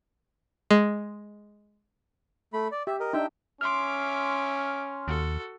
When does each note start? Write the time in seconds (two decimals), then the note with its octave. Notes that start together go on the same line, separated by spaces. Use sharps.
0.70 G#3
2.53 A3 B5
2.72 D5
2.87 G4 E5
3.00 A#4 D#5
3.13 D4 D#4 E5 G5
3.61 C#4 E5 C6 D6 F6
5.08 D#2 F#4 A4